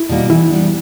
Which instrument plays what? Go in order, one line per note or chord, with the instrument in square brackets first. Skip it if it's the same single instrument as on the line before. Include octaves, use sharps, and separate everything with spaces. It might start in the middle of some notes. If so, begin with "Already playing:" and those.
Already playing: [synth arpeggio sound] E4
[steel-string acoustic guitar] B2 G3 A#3 D#4
[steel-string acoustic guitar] E3 [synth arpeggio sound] E4
[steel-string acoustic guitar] G3 B3 D4